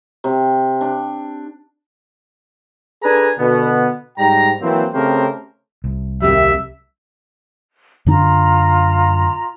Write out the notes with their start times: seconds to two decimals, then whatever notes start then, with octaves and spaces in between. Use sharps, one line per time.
0.24 C3
0.81 D4
3.03 D4 G#4 A4 B4 G#5 A#5
3.39 B2 D3 B3
4.18 G#2 G3 G5 A#5
4.62 E3 F#3 A#3 C4
4.94 C#3 A3 C4 G4 A#4 C5
5.84 C2
6.22 D#2 C3 G3 E5
8.06 F#2 D3 D4 F4 A#5